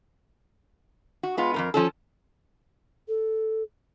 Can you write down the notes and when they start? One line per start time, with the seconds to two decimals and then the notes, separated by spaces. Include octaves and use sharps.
1.23 F#4
1.37 G#3 B3 F4
1.54 F2 A#2 A#4
1.74 F3 C#4 A4
3.08 A4